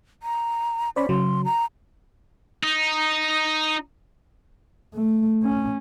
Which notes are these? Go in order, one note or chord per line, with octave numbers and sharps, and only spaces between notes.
A#5
C#4 C5 D5 B5
C#3 F#3 C6
A#5
D#4
A3
C#4